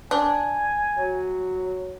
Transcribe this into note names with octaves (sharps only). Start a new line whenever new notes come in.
D4 G#5
F#3